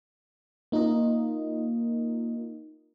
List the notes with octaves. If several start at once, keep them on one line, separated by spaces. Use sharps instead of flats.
A#3 D#4 F4 A#4 D#5